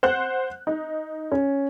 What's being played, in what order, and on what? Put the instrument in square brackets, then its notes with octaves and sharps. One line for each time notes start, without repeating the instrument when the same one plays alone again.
[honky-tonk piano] C5 F#5 F#6
D#4
[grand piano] C#4